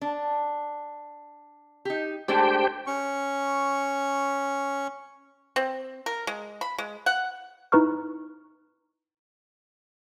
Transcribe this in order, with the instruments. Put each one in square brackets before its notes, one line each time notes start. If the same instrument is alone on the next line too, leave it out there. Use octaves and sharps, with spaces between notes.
[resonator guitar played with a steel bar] D4
D#4 G4
[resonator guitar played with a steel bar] G#3 A3 D4 [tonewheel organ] G4 C5 G5
[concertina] C#4 C#6
[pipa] C4
A#4
G#3
B5
G#3
F#5
[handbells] D#4 E4 B4 A#5 C#6 F6